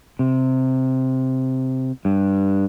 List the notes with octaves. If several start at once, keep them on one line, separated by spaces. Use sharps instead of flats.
C3
G2